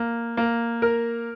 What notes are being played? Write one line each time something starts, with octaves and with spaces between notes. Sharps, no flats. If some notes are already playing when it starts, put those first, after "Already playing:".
Already playing: A#3
A#3
A#4